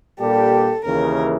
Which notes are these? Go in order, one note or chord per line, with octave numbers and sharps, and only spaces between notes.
A#2 G3 A#3 D4 G4 A4
D#2 C#3 E3 A#4